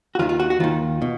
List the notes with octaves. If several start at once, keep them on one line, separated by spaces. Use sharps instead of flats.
F#4
D#2 D#3 F4
F4
F#4
F#4
D#2 D#3 F4
B2